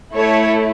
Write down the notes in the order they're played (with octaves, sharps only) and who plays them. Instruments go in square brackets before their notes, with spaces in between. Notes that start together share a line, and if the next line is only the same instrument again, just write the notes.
[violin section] A3 E4 A4 C#5